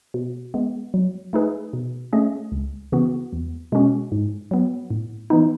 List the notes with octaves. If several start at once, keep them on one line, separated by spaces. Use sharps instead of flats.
B2
G#3 B3
F#3
A3 D#4 G#4 B4
B2
A3 C#4 G#4 D#5
C#2
C#3 E3 B3 F#4
E2
B2 G#3 C#4 F#4
G#2
F#3 B3
A2
E3 B3 D#4